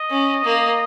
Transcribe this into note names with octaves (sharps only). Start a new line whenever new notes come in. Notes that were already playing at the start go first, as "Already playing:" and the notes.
Already playing: D#5
C#4
A#3